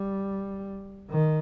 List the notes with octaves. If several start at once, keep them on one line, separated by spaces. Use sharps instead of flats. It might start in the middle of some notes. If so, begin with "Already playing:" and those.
Already playing: G3
D#3